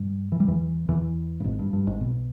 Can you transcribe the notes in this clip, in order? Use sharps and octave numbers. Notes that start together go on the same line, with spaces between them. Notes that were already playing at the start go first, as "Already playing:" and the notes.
Already playing: G2 G3
E3
G3
E2 E3
E2 E3
G2
G#1 G#2
G2
G2
G#1 G#2
B1 B2